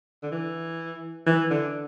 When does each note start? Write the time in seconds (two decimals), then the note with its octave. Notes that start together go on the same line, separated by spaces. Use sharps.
0.23 D3
0.32 E3
1.26 E3
1.51 D3